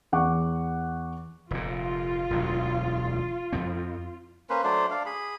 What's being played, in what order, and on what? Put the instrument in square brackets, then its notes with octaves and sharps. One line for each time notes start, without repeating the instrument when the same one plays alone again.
[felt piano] E2 F#5 C#6 D6
[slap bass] F1 A#2 [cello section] F4
[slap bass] E1 D2 F#3
F2 F3 C4
[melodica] A#3 C#4 B4 C5
F#3 A3 D4 C5
D4 F5
G#4 B5